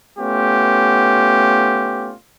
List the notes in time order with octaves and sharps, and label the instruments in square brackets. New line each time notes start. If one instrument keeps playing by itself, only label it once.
[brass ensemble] A3 B3 C#4 F4 G4